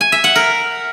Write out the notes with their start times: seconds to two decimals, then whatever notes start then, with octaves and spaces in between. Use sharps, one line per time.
0.01 G#5
0.12 E5
0.24 F#5
0.36 A#4